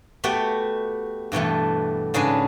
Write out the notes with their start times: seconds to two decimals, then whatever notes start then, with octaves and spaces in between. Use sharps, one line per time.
0.24 A3 B3 F#4 G4 G5
1.32 G2 B2 E3 A3
2.14 G#2 C#3 D4 B4 G#5